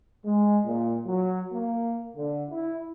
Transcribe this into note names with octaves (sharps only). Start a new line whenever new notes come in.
G#3
A#2
F#3
A#3
D3
E4